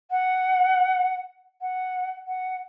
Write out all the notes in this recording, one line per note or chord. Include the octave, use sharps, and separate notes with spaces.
F#5
F#5
F#5